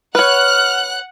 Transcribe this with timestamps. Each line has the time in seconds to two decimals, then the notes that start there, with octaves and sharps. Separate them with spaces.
0.15 B4 C#5 F#5 F6 F#6